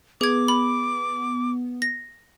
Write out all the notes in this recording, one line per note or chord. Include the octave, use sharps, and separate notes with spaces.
B3 G#4 D6 G#6
B5
A#6